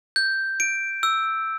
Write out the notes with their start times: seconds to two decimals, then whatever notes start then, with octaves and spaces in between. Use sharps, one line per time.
0.16 G6
0.60 D7
1.03 E6